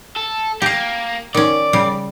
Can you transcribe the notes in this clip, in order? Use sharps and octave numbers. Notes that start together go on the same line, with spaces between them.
A4
A#3 G4 F5
D#3 C#4 D5
C#3 G3